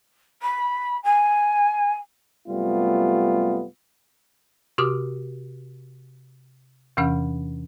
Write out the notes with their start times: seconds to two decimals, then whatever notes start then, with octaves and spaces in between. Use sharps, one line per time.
0.42 B5
1.04 G#5
2.48 F#2 C3 G3 A3 B3 F4
4.78 C3 F#4 G4 D6 D#6 F6
6.97 E2 C3 E3 C#4 F#5 F6